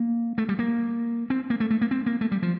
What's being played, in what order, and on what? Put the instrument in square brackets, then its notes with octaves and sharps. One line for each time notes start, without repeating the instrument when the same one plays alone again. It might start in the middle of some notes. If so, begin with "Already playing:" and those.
Already playing: [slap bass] A#3
A3
G3
A#3
C4
A#3
A3
A3
A#3
C4
A#3
A3
G3
F3